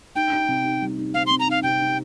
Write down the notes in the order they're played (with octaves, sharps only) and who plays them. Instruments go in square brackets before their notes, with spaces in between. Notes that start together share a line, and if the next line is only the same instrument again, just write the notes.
[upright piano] D#4 [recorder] G5
[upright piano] D#4
C3
D#4
G3
D#4
[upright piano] C4 [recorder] F5
[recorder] C6
[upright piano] C4
[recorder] A#5
[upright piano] D#4 [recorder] F5
[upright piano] C3 [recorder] G5
[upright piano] D#4